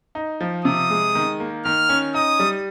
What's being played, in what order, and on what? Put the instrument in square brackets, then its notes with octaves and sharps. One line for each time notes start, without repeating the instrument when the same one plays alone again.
[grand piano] D#4
F3
[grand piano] C3 [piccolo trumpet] D#6
[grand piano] G#3
D#3
A#3
[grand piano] D#3 [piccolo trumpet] F6
[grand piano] C#4
[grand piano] D#4 [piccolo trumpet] D#6
[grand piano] G3